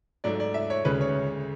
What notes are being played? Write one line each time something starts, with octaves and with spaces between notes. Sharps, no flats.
G#2 F#3 A3 D5
D5
E5
C#5
D2 C#3 G#3 B4
C#5